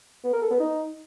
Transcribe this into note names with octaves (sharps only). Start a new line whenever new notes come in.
B3
A#4
A4
B3
D#4